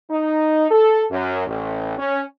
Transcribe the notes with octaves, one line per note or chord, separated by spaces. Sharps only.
D#4
A4
F#2
A1
C#4